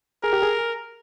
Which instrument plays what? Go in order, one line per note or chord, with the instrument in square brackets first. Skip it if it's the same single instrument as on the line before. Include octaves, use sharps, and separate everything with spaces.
[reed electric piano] G#4 [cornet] A#4
[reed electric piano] G4
G#4